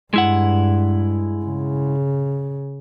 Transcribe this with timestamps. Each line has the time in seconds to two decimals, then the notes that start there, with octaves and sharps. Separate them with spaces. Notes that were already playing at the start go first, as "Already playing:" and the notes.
0.14 G2 G#3 E4 F#5
1.45 C#3